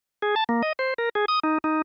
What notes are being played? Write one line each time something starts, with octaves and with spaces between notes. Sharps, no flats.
G#4
A5
A#3
D#5
C5
A#4
G#4
D#6
D#4
D#4